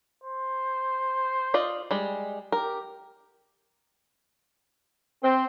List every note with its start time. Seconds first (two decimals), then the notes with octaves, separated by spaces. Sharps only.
0.24 C5
1.54 F4 D5 D#5
1.91 G3 G#3
2.52 G4 A#4
5.23 C4